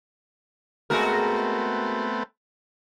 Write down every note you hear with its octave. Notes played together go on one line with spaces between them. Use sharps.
G#3 A3 B3 C4 F#4 A#4